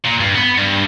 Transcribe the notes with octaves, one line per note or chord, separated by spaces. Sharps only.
A#2
G2
B3
G2